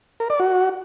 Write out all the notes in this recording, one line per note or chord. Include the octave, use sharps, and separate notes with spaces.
A#4
D5
F#4